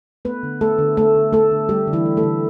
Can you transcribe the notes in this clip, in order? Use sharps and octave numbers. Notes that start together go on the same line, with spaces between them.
A3 B3 B4
D3
A3 A4
D3
A3 A4
D3
A3 A4
D3
G3 A3 G4
D3
E3 E4
A3
A3 A4
D3